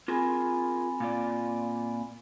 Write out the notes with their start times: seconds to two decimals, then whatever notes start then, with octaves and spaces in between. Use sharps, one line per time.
0.08 C4 F4 G#4 A#4 G#5 B5
1.00 A#2 F4 D5